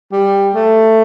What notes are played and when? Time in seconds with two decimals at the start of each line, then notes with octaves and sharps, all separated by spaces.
0.12 G3
0.55 A3